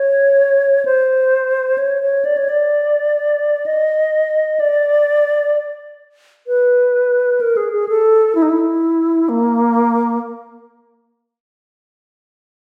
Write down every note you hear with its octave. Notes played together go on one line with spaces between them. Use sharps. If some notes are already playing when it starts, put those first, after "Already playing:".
Already playing: C#5
C5
C#5
C#5
D5
C#5
D5
D#5
D5
B4
A#4
G#4
G#4
A4
E4
D#4
E4
A#3